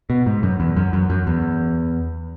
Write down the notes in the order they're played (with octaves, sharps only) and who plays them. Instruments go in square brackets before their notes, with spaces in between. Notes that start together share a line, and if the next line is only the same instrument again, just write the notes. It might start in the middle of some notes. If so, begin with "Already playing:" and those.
[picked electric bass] B2
G#2
F#2
E2
F#2
F#2
F#2
E2